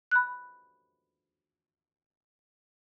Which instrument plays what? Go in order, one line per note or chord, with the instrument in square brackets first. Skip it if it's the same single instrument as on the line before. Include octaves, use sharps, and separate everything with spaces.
[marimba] B5 F#6